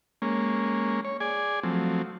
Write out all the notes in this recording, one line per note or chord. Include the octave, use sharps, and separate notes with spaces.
G#3 A#3 C#4
C#5
G#4 D5 G#5
F3 F#3 A3 C4